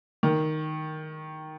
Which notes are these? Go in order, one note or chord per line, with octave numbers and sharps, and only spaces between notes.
D#3